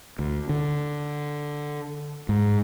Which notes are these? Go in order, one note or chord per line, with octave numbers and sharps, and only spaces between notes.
D2
D3
G#2